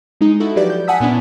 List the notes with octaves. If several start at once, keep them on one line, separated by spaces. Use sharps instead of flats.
G#3 D#4
D#4 E4 F#4 A4
F3 F#3 G4 B4 D5
G6
F#5 G#5 A5 D#6 E6 B6
A#2 B3 C#4 D4 E4